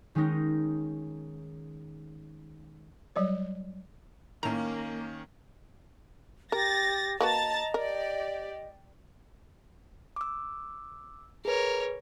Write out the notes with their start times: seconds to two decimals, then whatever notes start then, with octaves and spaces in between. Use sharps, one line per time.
0.15 D#3 G#3 C#4 D#4 A#6
3.16 F#3 G3 C#5
4.43 A2 D#3 A#3 C#4 A#5
6.52 G4 A#4 A6 A#6
7.21 A#3 F#4 B4 D#5 A5 A#5 A6
7.74 G4 A#4 D5
10.16 D6 E6
11.45 G#4 A#4 B4 C#5